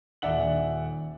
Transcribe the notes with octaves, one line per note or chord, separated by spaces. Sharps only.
D#1 D5 E5 F#5 F#7